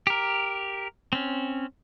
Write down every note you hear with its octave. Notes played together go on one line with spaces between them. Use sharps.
G4 A#4
C4 C#4